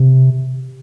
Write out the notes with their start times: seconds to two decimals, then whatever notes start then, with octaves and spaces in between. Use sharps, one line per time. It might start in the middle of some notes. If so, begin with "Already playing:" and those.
Already playing: C3